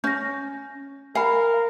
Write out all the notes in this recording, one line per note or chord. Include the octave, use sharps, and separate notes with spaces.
C#4 G6 A#6
A#4 F5 G#5 B5